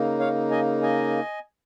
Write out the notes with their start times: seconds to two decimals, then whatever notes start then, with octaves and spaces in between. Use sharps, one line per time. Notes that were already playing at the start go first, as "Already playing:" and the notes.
Already playing: C#3 A#3 D#4
0.19 C#5 F5
0.51 D#5 G#5
0.83 D#5 G#5